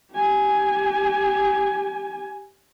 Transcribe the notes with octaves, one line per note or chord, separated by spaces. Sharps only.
G4 G#5